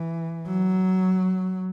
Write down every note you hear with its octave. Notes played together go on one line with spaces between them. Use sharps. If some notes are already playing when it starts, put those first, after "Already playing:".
Already playing: E3
F#3